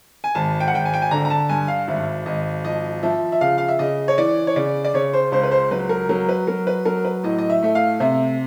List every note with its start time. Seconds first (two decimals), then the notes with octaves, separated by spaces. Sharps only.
0.24 G#5
0.35 G#1 A5
0.60 G5
0.68 F#5
0.73 G#1 G5
0.85 G#5
0.94 G5
1.02 G#5
1.11 D3 A#5
1.25 A#5
1.30 A5
1.49 G2 G#5
1.68 F5
1.87 G#1 E5
2.26 G#1 D#5
2.64 F3 D#5
3.03 F3 E5
3.32 E5
3.41 C#3 F5
3.58 F5
3.69 E5
3.79 C#3 D#5
4.08 C#5
4.18 E3 D5
4.47 C#5
4.56 C#3 D5
4.84 D5
4.94 C#3 C#5
5.14 C5
5.32 C#2 C5
5.43 B4
5.51 C5
5.71 F#3 B4
5.89 A#4
6.09 F#3 A#4
6.29 B4
6.47 F#3 A#4
6.67 B4
6.85 F#3 A#4
7.05 B4
7.23 A2 D#5
7.38 D#5
7.50 E5
7.62 A3 E5
7.75 F5
8.00 C3 E5